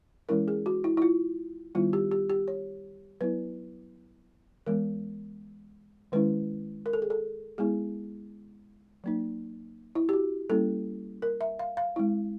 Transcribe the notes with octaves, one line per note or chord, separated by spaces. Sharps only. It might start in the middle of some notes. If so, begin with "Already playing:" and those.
E3 G#3 C#4 E4 A#4
G#4
F#4
E4
E4
F4
D#3 G3 B3 E4 F4
G4
G4
G4
C#5
F#3 B3 E4 B4
E3 G#3 B3 A#4
D#3 G#3 C#4 E4 B4
A#4
A4
G#4
A4
G#3 B3 E4 G#4
F#3 A#3 D#4
E4
G4
F#4
G3 A#3 C#4 E4 A4
A#4
E5
F5
F5
G#3 C4 E4